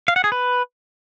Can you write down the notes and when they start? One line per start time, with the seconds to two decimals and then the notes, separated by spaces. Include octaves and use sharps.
0.08 F5
0.16 F#5
0.24 G#4
0.32 B4